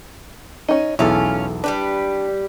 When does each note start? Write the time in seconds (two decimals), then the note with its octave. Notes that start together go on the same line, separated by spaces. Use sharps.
0.68 C#4 D#4
0.99 B1 E2 C#4 E4 F4 A4
1.64 G3 D4 G4 B4